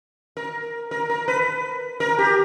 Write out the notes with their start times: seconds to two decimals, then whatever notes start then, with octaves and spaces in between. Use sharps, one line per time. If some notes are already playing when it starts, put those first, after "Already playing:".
0.37 A#4
0.91 A#4
1.10 A#4
1.28 B4
2.00 A#4
2.18 G4